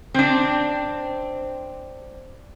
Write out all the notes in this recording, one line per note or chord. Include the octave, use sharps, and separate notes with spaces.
C4 D4